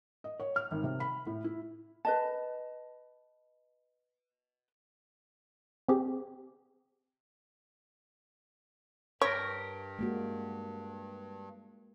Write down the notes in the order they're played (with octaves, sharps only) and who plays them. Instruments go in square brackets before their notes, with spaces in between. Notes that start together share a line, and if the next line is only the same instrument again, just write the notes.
[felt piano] D#5
C#5
F6
G#1
C3
B5
A2
E4
[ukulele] B4 D#5 A5
[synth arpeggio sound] C4 G4 G#4
[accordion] G2 [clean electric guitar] G4 A#4 [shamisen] C#5
[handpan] G#3 A#3 F#4